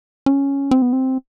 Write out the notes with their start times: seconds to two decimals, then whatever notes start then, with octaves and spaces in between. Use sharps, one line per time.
0.26 C#4
0.71 C4
0.82 B3
0.93 C4